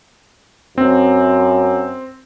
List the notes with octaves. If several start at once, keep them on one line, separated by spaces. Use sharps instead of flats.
F#2 C4